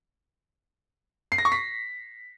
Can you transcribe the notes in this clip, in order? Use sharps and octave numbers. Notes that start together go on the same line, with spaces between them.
C7
A#6
C#6
B6